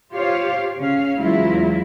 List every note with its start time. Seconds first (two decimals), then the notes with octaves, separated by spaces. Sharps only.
0.13 F4 G4 C5 C#5 F5
0.78 C#3 C#4 F5
1.16 E2 F#3 G#3 E4 F4